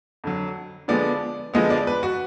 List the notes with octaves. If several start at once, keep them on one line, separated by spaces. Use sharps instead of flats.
F2 D3 F#3
D3 F3 G#3 B3 D5
D3 F3 G#3 B3 D#5
D5
B4
F#4